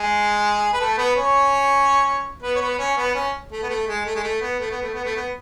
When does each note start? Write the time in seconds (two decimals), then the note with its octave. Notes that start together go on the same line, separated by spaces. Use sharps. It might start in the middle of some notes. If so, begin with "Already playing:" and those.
Already playing: G#3 G#4
0.73 B4
0.80 A3 A4
0.98 B3 B4
1.15 C#4 C#5
2.42 B3 B4
2.55 C#5
2.61 B3 B4
2.78 C#4 C#5
2.97 B3 B4
3.14 C#4
3.52 A3
3.63 B3
3.69 A3
3.87 G#3
4.06 A3
4.15 G#3
4.23 A3
4.41 B3
4.60 A3
4.71 B3
4.82 A3
4.94 B3
5.05 A3
5.16 B3